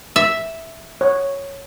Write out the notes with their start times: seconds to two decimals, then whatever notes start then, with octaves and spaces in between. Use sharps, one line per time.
0.16 E5
1.01 C#5